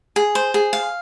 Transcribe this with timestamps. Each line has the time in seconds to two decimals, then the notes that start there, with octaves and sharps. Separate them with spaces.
0.16 G#4
0.35 C5
0.54 G#4
0.73 F5